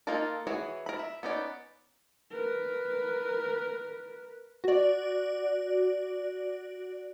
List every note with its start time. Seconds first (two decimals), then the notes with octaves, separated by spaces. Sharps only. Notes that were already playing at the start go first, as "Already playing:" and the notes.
0.07 A#3 D#4 F4 A4 A#4
0.47 E3 F#4 G#4 C#5
0.86 A#4 B5
0.99 E5
1.23 B3 C#4 D#4 D5
2.31 A#4 B4
4.64 F#4 D5